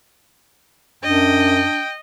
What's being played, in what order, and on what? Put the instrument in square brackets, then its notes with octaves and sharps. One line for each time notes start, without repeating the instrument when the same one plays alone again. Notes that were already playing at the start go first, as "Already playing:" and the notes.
[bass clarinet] F#2 [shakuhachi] D4 [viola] D#5 [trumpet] G5